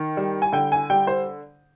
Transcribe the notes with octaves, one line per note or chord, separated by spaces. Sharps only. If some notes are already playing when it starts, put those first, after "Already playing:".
Already playing: D#3
G3
G#5
D3 G5
G#5
G3 G5
C5